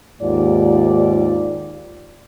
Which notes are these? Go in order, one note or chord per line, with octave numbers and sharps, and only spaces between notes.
D#2 G#2 F4 D5